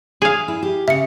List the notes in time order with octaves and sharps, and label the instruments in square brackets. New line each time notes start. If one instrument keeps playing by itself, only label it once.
[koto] G#4 F5
[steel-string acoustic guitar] E4
G4
[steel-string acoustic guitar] C#3 [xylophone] E5 C#7